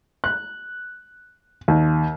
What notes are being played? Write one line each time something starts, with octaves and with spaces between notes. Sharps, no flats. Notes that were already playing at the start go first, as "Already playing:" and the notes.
F#6
D#2